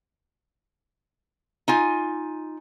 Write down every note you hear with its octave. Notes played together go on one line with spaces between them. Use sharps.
D#4 F4 G#5